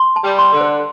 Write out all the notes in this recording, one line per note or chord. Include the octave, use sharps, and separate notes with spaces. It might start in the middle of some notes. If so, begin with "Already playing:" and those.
Already playing: C6
A5
G3
C6
D3
C5